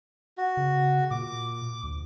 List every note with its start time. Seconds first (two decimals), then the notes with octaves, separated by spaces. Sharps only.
0.38 F#4
0.57 C#3
1.11 A#2 D6
1.83 D2